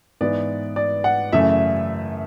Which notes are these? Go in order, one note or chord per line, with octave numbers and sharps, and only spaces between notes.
G#2 E3 B3 D5
D5
F#5
F#2 C#3 E3 A3 E5